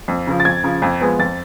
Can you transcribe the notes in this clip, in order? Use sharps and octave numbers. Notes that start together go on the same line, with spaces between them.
F2
C#3 F3
A6
F2 G#6
C#3 F3
F2
F3 G#3 B3
F2 A6